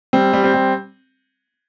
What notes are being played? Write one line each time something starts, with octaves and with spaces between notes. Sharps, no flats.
G3 C4
G3
C4
G3